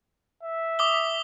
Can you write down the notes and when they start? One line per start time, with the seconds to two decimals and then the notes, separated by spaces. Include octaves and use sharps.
0.43 E5
0.79 D6 D#6 G7